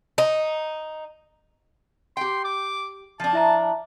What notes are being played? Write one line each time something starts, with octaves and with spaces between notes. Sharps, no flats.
D#4
G4 G5 C6
D6
F3 D4 A5
E4 E5 A#5